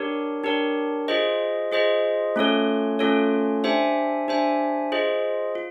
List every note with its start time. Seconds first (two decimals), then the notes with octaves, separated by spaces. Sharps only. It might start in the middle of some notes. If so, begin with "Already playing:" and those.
Already playing: D4 G4 A#4 C#5
0.44 D4 G4 A#4 C#5
1.08 F4 G#4 C5 D#5
1.72 F4 G#4 C5 D#5
2.36 A3 C#4 F4 A4 C#5
2.99 A3 C#4 F4 A4 C#5
3.64 D4 G4 C5 E5 G#5
4.28 D4 G4 C5 E5 G#5
4.92 F4 G#4 C5 D#5
5.55 F4